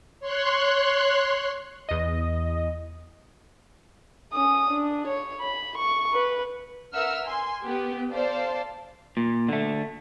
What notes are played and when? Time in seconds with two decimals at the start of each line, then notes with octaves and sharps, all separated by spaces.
0.20 C#5 C6 F#6
1.89 E2 D#5
4.32 C#4 D#6
4.70 D4
5.07 C#5
5.41 B5
5.77 C#6
6.13 B4
6.94 A#4 B4 E5 F#5 E6 F6
7.25 G#5 C6
7.63 B3 G4
8.12 A4 C5 D5 F5 A5
9.17 A#2
9.49 D3 A3